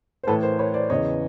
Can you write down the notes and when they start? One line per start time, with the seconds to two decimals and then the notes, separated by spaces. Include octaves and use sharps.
0.23 C5
0.27 A2 E3 A4 B4
0.43 A#4 C5
0.59 B4 C#5
0.74 C5 D5
0.90 E2 C#3 E3 C#5 D#5